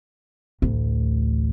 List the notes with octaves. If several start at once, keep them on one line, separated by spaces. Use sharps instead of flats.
A1 D2